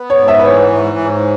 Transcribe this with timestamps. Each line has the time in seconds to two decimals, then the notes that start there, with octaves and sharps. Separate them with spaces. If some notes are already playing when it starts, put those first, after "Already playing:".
Already playing: B3
0.10 C#5
0.19 G#2
0.28 E5
0.39 B4
0.45 E3 C#5
0.72 G#2
0.98 G#2